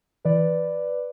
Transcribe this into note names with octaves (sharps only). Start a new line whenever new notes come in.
E3 B4 D5